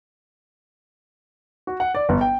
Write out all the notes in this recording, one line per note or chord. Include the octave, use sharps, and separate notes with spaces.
F#4
F#5
D5
G1
G5